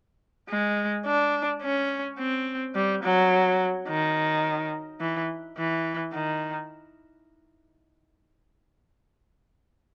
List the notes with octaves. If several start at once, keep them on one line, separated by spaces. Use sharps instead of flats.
G#3
D4
C#4
C4
G3
F#3
D#3
E3
E3
D#3